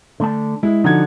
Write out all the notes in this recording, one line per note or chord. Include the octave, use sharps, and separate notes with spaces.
D3 A3 A5
G#3 E4
D3 F3 D#4 F#4 G#6